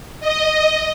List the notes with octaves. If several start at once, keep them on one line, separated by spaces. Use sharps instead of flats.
D#5